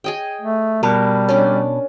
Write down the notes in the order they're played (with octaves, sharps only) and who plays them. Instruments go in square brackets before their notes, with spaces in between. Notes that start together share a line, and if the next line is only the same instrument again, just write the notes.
[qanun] G#4 D#5 G5
[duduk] A3
[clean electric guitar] B2 A5 [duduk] G3 [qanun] A#4
[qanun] C#4 D4